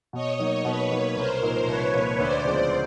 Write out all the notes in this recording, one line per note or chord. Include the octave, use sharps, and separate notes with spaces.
B2 C#5 D#5
F#3 A#3 D#4
B2 B4 C#5
F#3 A#3 D#4
C2 A#4 C5
A#2 F3 A#3 D#4
C2 B4 C#5
A#2 F3 A#3 D#4
D2 C5 D5
C#3 F3 G#3 B3